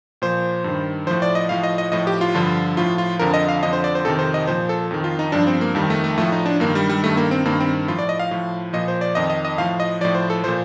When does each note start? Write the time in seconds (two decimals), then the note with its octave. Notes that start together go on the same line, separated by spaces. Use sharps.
0.22 A#2 F3 C5
0.64 G2 D#3
1.07 A2 F3 C5
1.22 D5
1.35 D#5
1.49 A2 F3 F5
1.63 D#5
1.78 D#5
1.92 A2 F3 D#5
2.07 G4
2.21 F4
2.34 G2 D3 F3
2.77 A2 F3 F4
2.98 F4
3.19 F2 D3 F3 A#4
3.34 D#5
3.48 F5
3.63 F2 D3 F3 D#5
3.73 C5
3.84 D5
3.95 C5
4.05 F2 C3 D#3 A4
4.19 C5
4.34 D#5
4.47 A#2 F3 C5
4.69 A4
4.91 F2 D#3
5.04 F4
5.19 D#4
5.32 G2 F3 D4
5.47 C4
5.61 A#3
5.75 F2 D#3 G3
5.90 A3
6.04 A3
6.17 A2 F3 A3
6.32 D#4
6.46 D4
6.60 G2 D#3 A#3
6.75 G3
6.89 G3
7.03 G2 D#3 A3
7.17 A#3
7.31 C4
7.45 G2 D#3 A#3
7.60 C4
7.88 A2 F3 F4
7.99 D5
8.09 D#5
8.19 F5
8.31 A2 F3
8.73 A#2 F3 D#5
8.88 C5
9.01 D5
9.15 F2 D#3 D#5
9.30 D#5
9.45 D#5
9.58 A2 F3 F5
9.80 D#5
10.01 A2 F3 D5
10.15 C5
10.30 A4
10.44 A#2 F3 C5